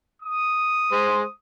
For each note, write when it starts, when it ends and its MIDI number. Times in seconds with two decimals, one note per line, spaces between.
0.23 1.33 87
0.92 1.23 56
0.92 1.23 72